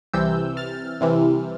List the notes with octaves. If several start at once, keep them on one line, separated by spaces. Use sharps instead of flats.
C2 C3 E3 E6 G6
F6 A6
C2 C3 E3